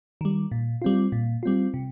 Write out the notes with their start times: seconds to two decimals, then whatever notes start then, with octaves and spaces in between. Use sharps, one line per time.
0.21 D#3 G3
0.51 A#2
0.82 G3 C4 F4
1.12 A#2
1.43 G3 C4 F4
1.74 C3